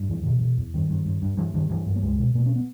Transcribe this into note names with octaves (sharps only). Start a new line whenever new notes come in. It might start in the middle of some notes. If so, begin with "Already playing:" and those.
Already playing: G2
E2 E3
B2 D#3
E3
B2
E2
G2 D#3
G2
G2
G2
G2 E3
G2 D#3
G2 E3
G2
A#3
C#2 G#3
B2
B2 A#3
C#4
B3